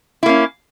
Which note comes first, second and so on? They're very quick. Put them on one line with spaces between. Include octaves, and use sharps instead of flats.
E4 A#3 C#4